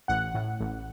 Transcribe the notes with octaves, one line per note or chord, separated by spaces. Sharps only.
A1 F#5
A2
A1